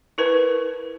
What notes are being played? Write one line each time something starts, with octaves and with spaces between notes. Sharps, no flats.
E4 A#4 B4